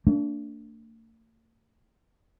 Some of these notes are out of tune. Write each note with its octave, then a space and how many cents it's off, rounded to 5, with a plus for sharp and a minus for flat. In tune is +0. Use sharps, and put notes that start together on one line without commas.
A3 +45 D4 -15